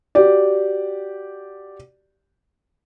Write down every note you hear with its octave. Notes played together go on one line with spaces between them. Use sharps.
F#4 G4 D5